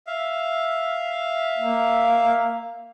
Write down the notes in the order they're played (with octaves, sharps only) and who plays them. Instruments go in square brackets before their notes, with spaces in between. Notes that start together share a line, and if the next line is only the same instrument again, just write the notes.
[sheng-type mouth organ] E5 F5
[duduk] A#3